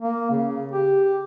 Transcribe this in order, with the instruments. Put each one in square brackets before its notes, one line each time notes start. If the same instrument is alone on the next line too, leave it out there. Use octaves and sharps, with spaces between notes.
[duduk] A#3
C#3
G4